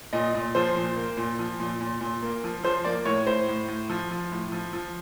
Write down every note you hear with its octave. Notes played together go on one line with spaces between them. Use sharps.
A#2 D#5
A#2
F3 C5
A#2
A#3
A#2
F3
A#2
A#2
A#2
A#3
F3
F3 C5
A#3 D5
A2 C#5
A2 C5
A2
A2
F3
F3
A2
F3
F3